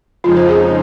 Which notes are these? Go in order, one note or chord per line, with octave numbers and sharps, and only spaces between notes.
F2 C#3 F3 G#3 D#4 F4
C5
G#4